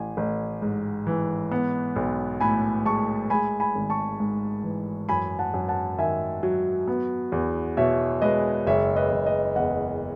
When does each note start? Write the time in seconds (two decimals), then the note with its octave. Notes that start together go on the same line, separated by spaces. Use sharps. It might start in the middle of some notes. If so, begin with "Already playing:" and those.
Already playing: A1 G#5
0.17 A1
0.62 G#2
1.07 E3
1.52 B3
1.96 B1
2.40 A2 G#5 B5
2.85 G#3 A5 C#6
3.30 G#3 G#5 B5
3.60 G#5 B5
3.75 G#1
3.90 A5 C#6
4.20 G#2
4.64 E3
5.09 F#2 G#5 B5
5.39 F#5 A5
5.54 F#2
5.69 F#5 A5
5.98 D#3 E5 G#5
6.43 F#3
6.88 B3
7.32 E2
7.77 B2 C#5 E5
8.22 G#3 B4 D#5
8.67 F#1 C#5 E5
8.96 B4 D#5
9.12 F#1
9.26 B4 D#5
9.56 E2 D#5 F#5